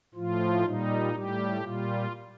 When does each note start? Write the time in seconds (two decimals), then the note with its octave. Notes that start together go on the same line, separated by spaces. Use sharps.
0.14 A2 F3 F4
0.63 A#2 G3 D#4
1.13 A2 G3 G4
1.61 A#2 G3 F4